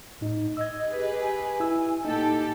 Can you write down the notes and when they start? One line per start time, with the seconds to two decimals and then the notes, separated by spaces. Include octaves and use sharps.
0.21 A2 D#4
0.57 D#5 E6 G#6
0.87 G4 G#4 B4
1.20 G#5
1.60 E4 E6
2.05 A#2 D#4 G4 A4